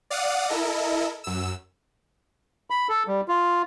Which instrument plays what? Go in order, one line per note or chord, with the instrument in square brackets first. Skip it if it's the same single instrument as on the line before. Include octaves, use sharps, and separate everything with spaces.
[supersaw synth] D5 F5 F#5 D#6
E4 A4 A#4 D#5
F#2 E6
[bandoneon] B5
A4
G3
F4